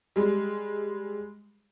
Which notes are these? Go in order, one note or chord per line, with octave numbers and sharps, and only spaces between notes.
G3 G#3